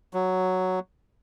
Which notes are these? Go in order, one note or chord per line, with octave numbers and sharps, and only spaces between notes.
F#3